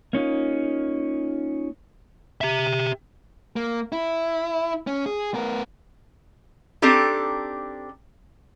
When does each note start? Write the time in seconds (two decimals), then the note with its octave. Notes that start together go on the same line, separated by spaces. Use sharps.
0.13 A#3 C#4 D#4 F4
2.41 G4 E5
3.56 A#3
3.92 E4
4.87 C#4
5.06 G#4
5.34 B3 A#4
6.82 C4 D4 D#4 G4 A4